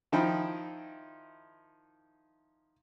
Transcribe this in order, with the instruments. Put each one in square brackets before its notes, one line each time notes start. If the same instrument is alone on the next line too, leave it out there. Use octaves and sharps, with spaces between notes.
[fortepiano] D#3 F3 D#4 E4 G5 B5